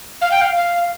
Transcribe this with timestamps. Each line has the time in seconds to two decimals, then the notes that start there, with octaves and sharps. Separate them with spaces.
0.21 F5
0.31 G5
0.41 F5
0.56 F5